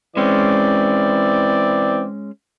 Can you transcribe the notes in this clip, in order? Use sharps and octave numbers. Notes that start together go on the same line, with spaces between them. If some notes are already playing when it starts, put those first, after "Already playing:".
E3 G#3 C4 C#4 D5